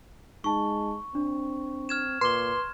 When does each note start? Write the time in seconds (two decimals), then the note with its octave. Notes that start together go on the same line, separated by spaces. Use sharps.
0.44 G#3 D#4 A5 C#6
1.15 C4 D4
1.89 F6 G#6 E7
2.21 A#2 B4 C6 D6 G7